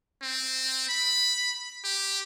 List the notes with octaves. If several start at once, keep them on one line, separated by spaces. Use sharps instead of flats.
C4
B5
G4